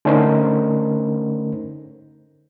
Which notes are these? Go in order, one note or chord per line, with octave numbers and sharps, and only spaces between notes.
D3 A3 C#4 D#4 A#4 C5